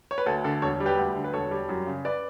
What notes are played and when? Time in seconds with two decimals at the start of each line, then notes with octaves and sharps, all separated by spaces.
0.11 C#5
0.18 B4
0.26 D2 A4
0.44 D3 A4
0.62 E1 A4 C#5
0.80 G3
0.86 G4 B4
0.98 D2
1.16 D3
1.24 B4
1.33 E1 A4 C#5
1.51 G3
1.69 F#2
1.87 C#3
2.05 B4 D5